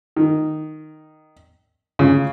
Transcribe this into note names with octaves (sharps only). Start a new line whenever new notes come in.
D#3
C#3